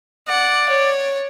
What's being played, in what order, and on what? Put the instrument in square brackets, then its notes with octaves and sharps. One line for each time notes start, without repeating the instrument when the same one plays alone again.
[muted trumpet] D5 [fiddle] F#5
[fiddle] C#5